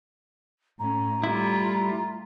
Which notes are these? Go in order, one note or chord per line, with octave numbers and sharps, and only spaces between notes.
A2 C#4 A#5
G3 A3 E4 F4